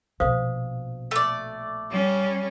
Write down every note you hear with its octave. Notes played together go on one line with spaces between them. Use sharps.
A#1 B2 C5 F5 D#6
A3 D5
G3 C#4